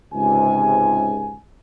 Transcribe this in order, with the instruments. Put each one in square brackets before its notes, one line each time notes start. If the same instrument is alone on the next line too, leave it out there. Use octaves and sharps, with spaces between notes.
[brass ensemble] C#2 G#2 C3 G#5